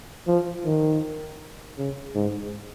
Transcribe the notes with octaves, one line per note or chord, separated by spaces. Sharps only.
F3
D#3
C#3
G#2